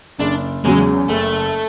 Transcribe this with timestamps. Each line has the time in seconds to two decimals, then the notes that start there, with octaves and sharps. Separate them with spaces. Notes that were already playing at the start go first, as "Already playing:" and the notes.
0.19 F#1 D4
0.64 E2 C#3 F#3 G#3
1.08 F#1 A3